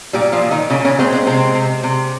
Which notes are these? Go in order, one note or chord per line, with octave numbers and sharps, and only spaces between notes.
A#2 G3 G4
F3 F4
A#2
D#3 D#4
A#2 C#3 C#4
C#3 C#4
G#3 C4
C4
C3 C4
C3
C3